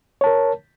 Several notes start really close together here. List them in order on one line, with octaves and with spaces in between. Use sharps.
C#5 A5 A#4